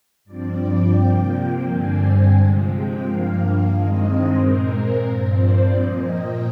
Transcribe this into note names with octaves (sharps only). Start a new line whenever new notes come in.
G2 F3 C4 D5
G5
C3 F3 A#3
G2 D3 G3 C4 G#5
C3 F3 G#3
G5
G2 F3 A#3 F5
G2 D#3 G#3 C4 D#5
C5
A#2 G#3 C4 A#4
A#4
G2 F3 C4 C5
D5
A#2 F3 A#3 D#5
G5